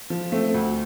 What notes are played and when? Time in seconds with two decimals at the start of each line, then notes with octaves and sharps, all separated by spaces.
0.10 F3
0.32 A3 C4
0.54 D2